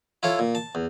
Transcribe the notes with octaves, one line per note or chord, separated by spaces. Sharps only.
E4 F4 A4 C#5
A#2
A5
E2